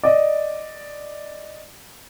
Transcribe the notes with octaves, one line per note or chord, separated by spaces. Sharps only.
D5 D#5